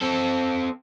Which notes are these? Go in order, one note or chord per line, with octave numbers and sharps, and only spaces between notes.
C4 A4